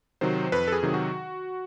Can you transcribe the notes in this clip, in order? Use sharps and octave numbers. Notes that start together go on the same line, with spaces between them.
C3 D#3 F#3 C5
F2 B4
A4
G#4
C3 D#3 F#3
F#4